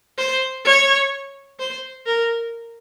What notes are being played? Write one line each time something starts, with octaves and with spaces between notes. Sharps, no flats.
C5
C#5
C5
A#4